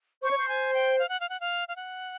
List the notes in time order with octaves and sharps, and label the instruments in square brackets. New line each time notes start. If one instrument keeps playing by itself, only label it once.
[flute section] C5 [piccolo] C#6
[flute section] C#5
C5
[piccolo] G#5
G5
F5
F#5
F5
F#5
F5
F5
F#5